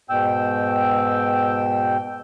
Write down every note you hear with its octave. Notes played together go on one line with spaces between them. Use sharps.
G#2 B2 G5 E6